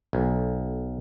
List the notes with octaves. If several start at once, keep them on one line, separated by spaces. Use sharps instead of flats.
B1